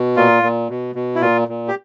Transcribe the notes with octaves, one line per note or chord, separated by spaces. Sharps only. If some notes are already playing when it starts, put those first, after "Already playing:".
Already playing: B2
A#2 F4
A#2
B2
B2
E4
A#2 F4
A#2
G4